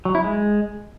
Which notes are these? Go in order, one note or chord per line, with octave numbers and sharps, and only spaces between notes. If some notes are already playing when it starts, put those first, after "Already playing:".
F#3
E4
G#3